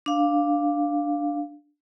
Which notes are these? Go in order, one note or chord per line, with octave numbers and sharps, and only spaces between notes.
D4 F5